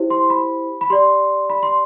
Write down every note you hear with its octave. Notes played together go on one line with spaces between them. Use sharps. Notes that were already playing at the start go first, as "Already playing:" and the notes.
Already playing: E4 G4 C5
C6
B5
B5
G4 D5 C6
B5
C6